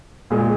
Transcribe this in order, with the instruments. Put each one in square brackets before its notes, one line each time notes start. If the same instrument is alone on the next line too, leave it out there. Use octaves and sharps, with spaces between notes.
[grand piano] A#2 G#3